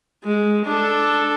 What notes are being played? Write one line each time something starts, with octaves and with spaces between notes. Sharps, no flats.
G#3
D4 A4